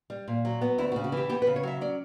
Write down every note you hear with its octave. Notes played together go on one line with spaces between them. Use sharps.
G3
A#2
F#3
B3
D2 E4
F#4
C#3
F#4
E3 G4
B3 G4
B4
C#3
C#5
F#3 E5
C#4 D5